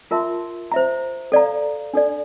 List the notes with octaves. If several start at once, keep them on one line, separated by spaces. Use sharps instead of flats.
F4 A#4 E5 A5 C6
C5 E5 A#5
A4 D5 F5 A#5
D4 A4 D5